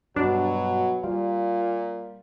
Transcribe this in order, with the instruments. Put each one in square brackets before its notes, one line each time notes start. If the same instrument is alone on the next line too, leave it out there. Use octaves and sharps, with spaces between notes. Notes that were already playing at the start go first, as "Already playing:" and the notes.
[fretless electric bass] G2 [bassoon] B2 [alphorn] F#3 [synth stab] D4
[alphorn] A#2 [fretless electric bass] G3 [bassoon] F4